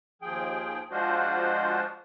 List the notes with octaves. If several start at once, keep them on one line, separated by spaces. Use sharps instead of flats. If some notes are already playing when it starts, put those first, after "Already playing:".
D#2 F3 G#4 G5
F3 G#3 D4 F4 F#4 C5